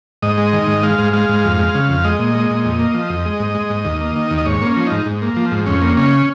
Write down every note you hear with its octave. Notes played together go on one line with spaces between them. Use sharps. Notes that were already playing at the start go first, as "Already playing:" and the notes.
G#2 D#5
G#3
D#3
G#2
G#3 F5
G#2
G#3 F5
G#2
F2
G#3
C#3
F2
G#3 D#5
A#2
G#3
A#2
F2
A#3
F3
F2
G#3
G#2
G#3
G#2
D#2
A#3
D#3
D#2
D#5
G#2 C#5
A#3 C#4
F3
G#2 D#4
G#2
A#3
F3
G#2
F2 C#4
A#3
C#3 C#4